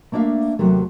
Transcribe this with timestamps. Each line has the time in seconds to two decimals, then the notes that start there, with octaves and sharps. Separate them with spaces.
0.12 A3 A#3 D4 D5 E5 F5
0.59 D#2 C3 F#3 A3